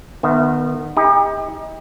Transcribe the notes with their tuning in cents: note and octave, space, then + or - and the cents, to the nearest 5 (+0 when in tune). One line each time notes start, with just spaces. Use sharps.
D#3 -35 B3 +0 E5 +0
D#4 +30 G4 +40